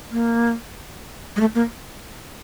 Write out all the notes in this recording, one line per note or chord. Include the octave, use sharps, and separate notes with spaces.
A#3
G#3
A3
A#3